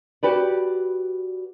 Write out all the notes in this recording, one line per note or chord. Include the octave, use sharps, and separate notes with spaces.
F#4 G4 B4 D5